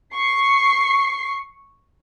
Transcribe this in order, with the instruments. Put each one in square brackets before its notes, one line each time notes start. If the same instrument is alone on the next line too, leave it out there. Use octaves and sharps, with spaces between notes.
[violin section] C#6 C7